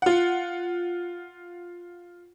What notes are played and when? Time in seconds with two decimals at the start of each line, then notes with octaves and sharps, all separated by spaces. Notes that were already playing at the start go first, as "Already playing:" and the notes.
0.02 F4 F#5